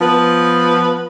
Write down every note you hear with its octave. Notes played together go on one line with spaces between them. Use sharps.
F3 B3 B4